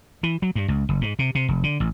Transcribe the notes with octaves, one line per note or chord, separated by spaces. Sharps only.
E3
F#3
G2
C#2
F#1
G#2
C3
C3
F1
D3
A1